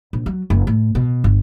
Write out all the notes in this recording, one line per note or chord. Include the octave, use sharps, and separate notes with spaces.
A#1
F#3
F#1
A2
B2
G1